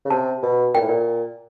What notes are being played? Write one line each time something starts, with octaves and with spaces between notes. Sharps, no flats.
C#3
C3 A5
B2
A#2 G5
A2
A#2